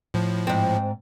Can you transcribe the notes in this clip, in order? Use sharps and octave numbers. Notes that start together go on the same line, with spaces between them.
A2 F3
G#2 C4